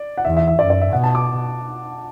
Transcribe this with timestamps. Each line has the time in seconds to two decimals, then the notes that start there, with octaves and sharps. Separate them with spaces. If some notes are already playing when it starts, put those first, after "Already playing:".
Already playing: D5
0.18 F#5
0.25 E2 E5
0.37 E5
0.47 E5
0.59 F#2 D5
0.70 D5
0.81 E5
0.91 B2 F#5
1.04 A5
1.15 D6